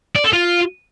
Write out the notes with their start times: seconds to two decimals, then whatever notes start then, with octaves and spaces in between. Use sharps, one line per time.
0.16 D5
0.25 A4
0.33 F4